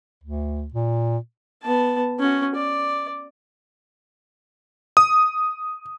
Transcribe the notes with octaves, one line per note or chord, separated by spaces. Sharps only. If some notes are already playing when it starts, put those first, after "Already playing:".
D2
A#2
B3 A5
C#4 F#4
D5
D#6